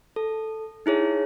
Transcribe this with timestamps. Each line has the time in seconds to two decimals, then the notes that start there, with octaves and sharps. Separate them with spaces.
0.16 A4
0.86 D#4 E4 G#4 C#5